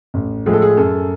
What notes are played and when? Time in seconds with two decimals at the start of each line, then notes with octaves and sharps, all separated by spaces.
0.14 A1
0.46 A2 F3 G#3 G#4
0.53 A4
0.62 G#4
0.77 F#2 A4